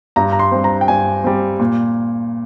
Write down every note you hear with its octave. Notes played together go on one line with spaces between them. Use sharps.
G2 A#5
A#5
C6
G3 C4
A#5
G5
G2 G#5
G3 C4
A#2